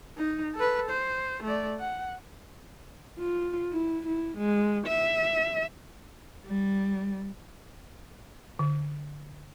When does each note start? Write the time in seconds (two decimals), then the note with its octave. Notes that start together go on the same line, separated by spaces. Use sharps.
0.17 D#4
0.55 A4 B4
0.90 C5
1.43 A3 D5
1.80 F#5
3.19 F4
3.73 E4
4.07 E4
4.38 G#3
4.88 E5
6.46 G3
8.59 D3